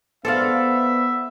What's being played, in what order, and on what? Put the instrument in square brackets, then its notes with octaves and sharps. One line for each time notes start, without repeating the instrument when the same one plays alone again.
[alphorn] B3 [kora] A4 [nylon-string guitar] C5 D5 F5 [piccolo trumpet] E5